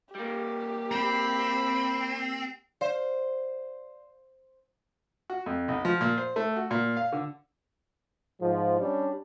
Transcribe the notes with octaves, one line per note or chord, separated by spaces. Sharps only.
G3 A#3 G4
C4 B5
C5 D5 F5
F#4
F2
B1
F3
A#2
C5
A3
F#4
A#2
F5
D3
G#2 F3
G3 C#4 D4 G4